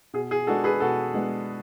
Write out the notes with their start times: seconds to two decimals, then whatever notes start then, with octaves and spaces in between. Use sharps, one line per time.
0.14 B2 G#4
0.31 G#4
0.47 G#3 B3 D4 F#4 A4
0.64 G#4 B4
0.80 B2 F#4 A4
1.14 G#3 B3 D4